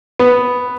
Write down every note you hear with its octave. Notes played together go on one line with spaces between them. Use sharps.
B3